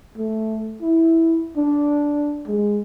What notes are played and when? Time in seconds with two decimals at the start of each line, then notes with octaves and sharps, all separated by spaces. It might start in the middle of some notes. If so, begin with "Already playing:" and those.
0.17 A3
0.81 E4
1.57 D4
2.47 G#3